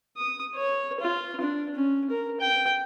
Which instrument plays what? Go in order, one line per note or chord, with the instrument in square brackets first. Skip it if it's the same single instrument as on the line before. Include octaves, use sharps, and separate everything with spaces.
[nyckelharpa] D#6
C#5
F4
D4
C#4
A#4
G5